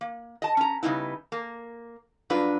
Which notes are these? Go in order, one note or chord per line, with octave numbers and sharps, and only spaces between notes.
A#3
D#5 A5
C#4 A#5
C#3 G3 B3 D#4 E4
A#3
G2 F#3 D4 F4 B4